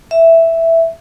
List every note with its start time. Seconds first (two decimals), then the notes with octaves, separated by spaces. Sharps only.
0.11 E5